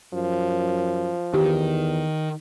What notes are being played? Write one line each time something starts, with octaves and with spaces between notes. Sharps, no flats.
F#2 F3
E2 D#3 G4